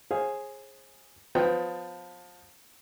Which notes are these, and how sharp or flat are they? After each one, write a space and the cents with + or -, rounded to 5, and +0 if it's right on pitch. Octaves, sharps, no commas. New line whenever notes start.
G#4 +0 C5 +40 F5 +0
F3 +25 B3 +30 G5 +0